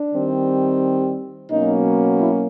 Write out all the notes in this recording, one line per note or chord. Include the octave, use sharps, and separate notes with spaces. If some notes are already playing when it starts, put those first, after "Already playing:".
Already playing: D4
D#3 G3 C4
B2 F#3 A#3 C#4 D#4
E4